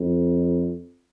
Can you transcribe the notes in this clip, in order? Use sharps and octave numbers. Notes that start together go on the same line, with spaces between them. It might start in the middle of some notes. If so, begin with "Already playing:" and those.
Already playing: F2